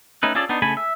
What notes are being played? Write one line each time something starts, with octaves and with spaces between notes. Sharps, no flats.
A3 C#4 D#4 B4
C#4 F4 G#4 A4 D5
B3 D4 D#4
C#3 A3 A4 G#5 B5
E5